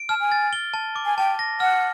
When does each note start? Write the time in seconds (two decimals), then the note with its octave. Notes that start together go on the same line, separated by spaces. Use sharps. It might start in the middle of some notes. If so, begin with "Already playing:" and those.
Already playing: D7
0.09 A5 F6
0.20 G#5
0.32 A6
0.53 G7
0.74 A5
0.96 D6
1.05 G#5
1.18 G5 A5
1.39 A#6
1.60 F#5 F6